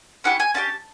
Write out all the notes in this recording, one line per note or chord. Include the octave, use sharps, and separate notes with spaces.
C#4 E4 G4 F#5
G#5
C#4 E4 G4 A5